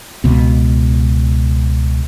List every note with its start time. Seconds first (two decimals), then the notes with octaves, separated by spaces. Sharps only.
0.24 C#2 B2